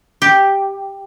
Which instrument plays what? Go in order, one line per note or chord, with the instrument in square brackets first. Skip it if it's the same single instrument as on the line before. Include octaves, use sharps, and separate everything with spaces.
[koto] G4